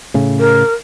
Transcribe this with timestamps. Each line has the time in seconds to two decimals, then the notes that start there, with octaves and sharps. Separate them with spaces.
0.14 A2 C#3
0.39 A#4